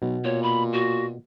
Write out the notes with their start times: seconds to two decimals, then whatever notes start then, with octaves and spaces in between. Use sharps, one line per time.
0.02 B1 B2
0.24 A#2 C#5
0.43 B5
0.73 F#4